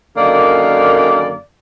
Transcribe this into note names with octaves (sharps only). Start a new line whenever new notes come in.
F#2 D3 D#3 A#3 D5